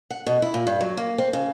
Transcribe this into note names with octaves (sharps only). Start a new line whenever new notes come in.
F#5
B2
E4
A#2
G2
F#3
A#3
C4
C#3